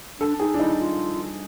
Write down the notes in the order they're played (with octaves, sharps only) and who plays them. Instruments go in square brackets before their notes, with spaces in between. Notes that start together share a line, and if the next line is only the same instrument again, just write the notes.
[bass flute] D4 [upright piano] A4
[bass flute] D#4 [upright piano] G#4
[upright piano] D4
[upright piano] D#4 [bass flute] E4
[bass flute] F4